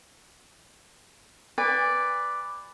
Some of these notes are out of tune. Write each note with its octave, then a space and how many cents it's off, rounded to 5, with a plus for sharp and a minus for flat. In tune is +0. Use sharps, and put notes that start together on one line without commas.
B4 +5 D5 +0 G#5 -35